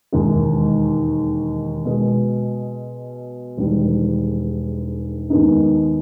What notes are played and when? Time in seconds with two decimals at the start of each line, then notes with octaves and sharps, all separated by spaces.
0.13 E1 D#2 D#3 G#3
1.85 B2 G#3 B3
3.57 E1 E2 D#3 G3
5.30 D#2 D#3 G#3 B3 D#4